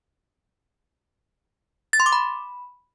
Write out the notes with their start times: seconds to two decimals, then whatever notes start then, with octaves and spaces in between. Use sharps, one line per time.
1.93 A6
2.00 C6
2.06 D6
2.12 B5